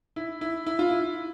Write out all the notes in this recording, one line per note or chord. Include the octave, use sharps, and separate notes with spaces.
E4
E4
E4
F4
E4